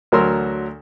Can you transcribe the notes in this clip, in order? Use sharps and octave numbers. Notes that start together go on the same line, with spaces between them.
D2 F#3 A#4 C6 E6